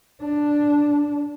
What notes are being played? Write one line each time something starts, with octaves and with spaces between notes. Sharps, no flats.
D4